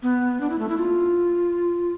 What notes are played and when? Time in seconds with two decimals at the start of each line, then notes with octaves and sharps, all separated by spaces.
0.03 B3
0.41 D4
0.50 E4
0.59 A3
0.69 E4
0.77 F4